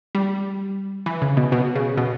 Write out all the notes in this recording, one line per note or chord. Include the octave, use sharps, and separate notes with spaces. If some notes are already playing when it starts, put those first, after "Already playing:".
G3
E3
C#3
B2
B2
C#3
B2